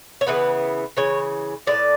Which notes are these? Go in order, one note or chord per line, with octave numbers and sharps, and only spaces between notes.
C#5
C#3 E3 B3 B4
C#3 E3 C#5
A2 G#3 B3 D5